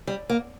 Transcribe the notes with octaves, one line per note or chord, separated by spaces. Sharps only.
G3
A#3